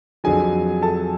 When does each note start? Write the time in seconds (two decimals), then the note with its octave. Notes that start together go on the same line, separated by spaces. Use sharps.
0.24 F2 D3 F#3 G#4 G#5
0.82 A4 A5